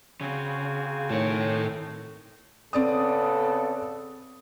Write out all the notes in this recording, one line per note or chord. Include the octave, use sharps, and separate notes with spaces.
C#3 C4 F#4 G#5
A2 D#3 A4 C#5
C#3 B3 C4 A4 D5 D#6